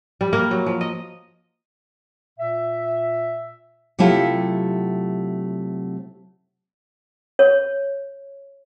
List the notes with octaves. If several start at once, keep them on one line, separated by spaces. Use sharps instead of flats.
G3
A#3
F#3
F3
D#5
A#2 E5
C3 F#3 A3 E4 F4 G4
C#5